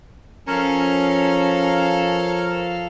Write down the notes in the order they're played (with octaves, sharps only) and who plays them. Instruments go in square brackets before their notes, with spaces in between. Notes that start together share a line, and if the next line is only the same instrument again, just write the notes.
[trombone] F3 [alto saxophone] C#4 [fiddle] A4 F5 [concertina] A#4 C#5 A#5